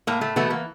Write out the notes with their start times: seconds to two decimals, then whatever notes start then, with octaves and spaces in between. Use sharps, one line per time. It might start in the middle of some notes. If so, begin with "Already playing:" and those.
0.07 A2 A#3
0.21 A3
0.36 B2 E3 A3 B3
0.50 A#3